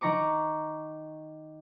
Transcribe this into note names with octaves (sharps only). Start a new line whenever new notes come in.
D#3 A#5 C#6 D6